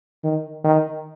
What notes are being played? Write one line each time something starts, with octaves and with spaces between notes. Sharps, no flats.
D#3
D#3